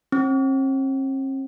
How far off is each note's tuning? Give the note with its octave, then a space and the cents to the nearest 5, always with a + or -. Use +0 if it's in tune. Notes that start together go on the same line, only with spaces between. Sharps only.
C4 +45